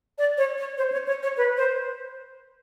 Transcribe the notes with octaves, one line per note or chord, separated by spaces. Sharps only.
D5
C#5
C#5
C5
C#5
C#5
C#5
B4
C5